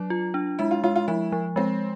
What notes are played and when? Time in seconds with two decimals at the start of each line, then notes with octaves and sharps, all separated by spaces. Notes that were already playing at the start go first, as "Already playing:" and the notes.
Already playing: F#3 D4
0.10 F4
0.34 D4
0.59 G#3 E4
0.71 F4
0.84 G#3 F4
0.96 F4
1.08 F3 E4
1.32 F3
1.56 G#3 C4